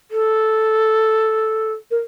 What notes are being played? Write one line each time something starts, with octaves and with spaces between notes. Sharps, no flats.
A4
A#4